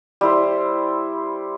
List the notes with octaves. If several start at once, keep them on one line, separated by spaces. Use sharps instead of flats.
G3 E4 C5